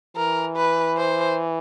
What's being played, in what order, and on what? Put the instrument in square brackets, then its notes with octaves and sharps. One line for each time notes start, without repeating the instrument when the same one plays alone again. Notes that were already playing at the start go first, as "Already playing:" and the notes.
[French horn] E3 [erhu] A#4
[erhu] B4
C5